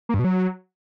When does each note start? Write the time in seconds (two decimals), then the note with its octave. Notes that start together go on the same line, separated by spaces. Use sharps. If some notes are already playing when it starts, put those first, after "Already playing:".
0.09 A#3
0.14 G2
0.19 B2
0.24 F#3